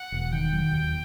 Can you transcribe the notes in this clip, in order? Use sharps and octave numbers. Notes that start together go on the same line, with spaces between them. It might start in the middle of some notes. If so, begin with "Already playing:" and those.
Already playing: F#5
E1
D#3 G5
F#3
D#2